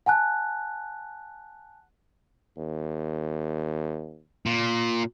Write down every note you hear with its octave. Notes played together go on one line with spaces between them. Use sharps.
F#5 G#5 A5 F#6
D#2
A#2